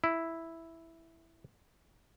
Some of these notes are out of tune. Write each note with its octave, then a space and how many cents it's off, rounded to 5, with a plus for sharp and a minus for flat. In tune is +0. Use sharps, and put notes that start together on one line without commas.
E4 +0